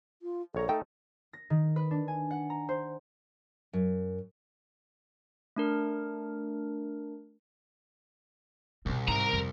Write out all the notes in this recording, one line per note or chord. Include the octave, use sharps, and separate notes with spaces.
F4
A#1 A4 C#5 A#5
A3 D#4 A4 G5 A5
A#6
D#3
B4
D4
G#5
F#5
A#5
C5
F#2
A3 D4 A#4
C2 B2 C4
G#2 D#4 A#4 A#5
F2